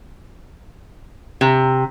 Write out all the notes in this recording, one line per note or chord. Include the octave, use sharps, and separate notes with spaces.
C3